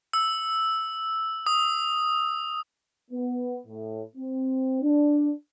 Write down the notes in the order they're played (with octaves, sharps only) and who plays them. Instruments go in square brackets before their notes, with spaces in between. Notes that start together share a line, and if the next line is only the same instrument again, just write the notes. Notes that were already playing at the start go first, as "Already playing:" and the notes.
[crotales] E6
D#6
[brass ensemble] B3
A2
C4
D4